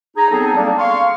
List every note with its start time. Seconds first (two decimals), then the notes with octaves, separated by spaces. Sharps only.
0.16 D#4 G#4 A#5
0.31 F#3 B3 C4 D#4 G#4 A4
0.56 G3 A#3 C4 D4
0.79 F5 C6 C#6